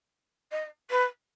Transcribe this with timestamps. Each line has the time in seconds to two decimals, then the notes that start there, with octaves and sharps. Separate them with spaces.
0.51 D#5
0.90 B4